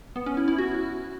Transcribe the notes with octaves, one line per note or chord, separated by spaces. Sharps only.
B3
C#4
E4
E4
F#4